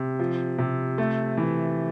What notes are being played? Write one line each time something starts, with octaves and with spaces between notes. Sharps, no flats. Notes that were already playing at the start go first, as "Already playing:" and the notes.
Already playing: C3
F3
C3
A3
E3